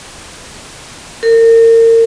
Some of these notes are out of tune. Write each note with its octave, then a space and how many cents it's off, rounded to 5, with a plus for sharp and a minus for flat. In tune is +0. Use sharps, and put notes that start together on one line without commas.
A#4 -35